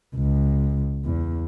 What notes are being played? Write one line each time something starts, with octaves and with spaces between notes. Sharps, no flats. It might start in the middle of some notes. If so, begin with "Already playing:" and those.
C#2
E2